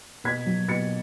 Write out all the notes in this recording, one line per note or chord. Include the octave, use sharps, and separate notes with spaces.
B2 G#6 B6
F#3
B2 A6 C#7